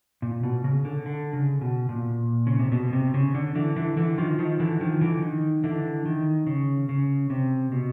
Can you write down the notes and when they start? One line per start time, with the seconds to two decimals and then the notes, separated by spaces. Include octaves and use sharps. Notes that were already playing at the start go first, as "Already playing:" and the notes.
0.22 A#2
0.43 B2
0.64 C#3
0.85 D3
1.06 D3
1.33 C#3
1.61 B2
1.89 A#2
2.47 C#3
2.59 C3
2.72 B2
2.93 C3
3.14 C#3
3.35 D3
3.55 D3 E3
3.76 D3 E3
3.97 D3 E3
4.18 D#3 F3
4.39 D#3 F3
4.60 D3 E3
4.81 D#3 F3
5.01 D3 E3
5.22 D#3
5.64 D3 E3
6.05 D#3
6.47 C#3
6.89 C#3
7.30 C3
7.72 B2